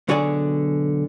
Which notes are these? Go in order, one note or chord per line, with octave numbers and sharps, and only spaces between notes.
B1 D3 F#4 G#4 D5 G#5